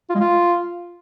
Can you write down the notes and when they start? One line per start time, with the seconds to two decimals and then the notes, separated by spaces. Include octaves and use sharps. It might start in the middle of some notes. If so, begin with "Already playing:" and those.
0.10 F4
0.15 G#3
0.20 F4